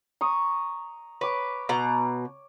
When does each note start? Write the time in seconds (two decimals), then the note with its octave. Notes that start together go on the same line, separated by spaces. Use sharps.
0.21 A#5 C#6 D#6
1.21 B4 C#5 D6
1.69 B2 A#5